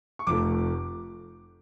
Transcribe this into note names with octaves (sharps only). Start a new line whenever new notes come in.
C#6
F1 F2 F3 A3 D6